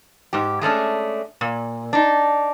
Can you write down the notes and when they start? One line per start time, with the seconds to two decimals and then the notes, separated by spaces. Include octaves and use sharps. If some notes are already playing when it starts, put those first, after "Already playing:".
0.33 G#2 G4
0.61 G#3 A3 C#4 D4
1.41 A#2
1.93 D4 D#4